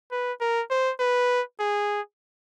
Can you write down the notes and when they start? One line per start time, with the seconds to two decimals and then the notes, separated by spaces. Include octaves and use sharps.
0.12 B4
0.41 A#4
0.71 C5
1.00 B4
1.60 G#4